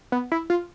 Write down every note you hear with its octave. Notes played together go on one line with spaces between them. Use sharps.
B3
E4
F4